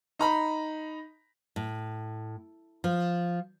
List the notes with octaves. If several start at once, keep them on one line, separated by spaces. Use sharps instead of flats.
D#4 A#5 B5
A2
F3